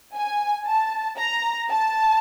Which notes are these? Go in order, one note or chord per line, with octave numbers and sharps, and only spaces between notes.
G#5
A5
A#5
A5